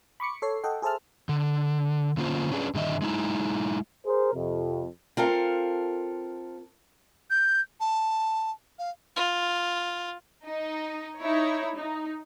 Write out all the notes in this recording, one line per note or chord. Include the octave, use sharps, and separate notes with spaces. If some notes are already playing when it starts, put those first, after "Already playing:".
B5 C#6 D6 C#7
A4 C#5 C7
A4 D#5 F#5 G5
G#4 A4 C5 E5 A5 F6
D3
D3 A#3 C#4 F4 C5
C#4 D4 G#4 B4
G2 D3 D#3 D#5 E5
G#3 D#4 E4
G#4 A#4 C5
F2 C3
C4 F4 A4 A#4
G6
A5
F5
F4
D#4
D#4 E4 C#5
D#4